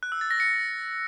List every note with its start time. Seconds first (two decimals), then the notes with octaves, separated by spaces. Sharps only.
0.03 F#6
0.12 E6
0.21 A6
0.31 A#6
0.40 C#7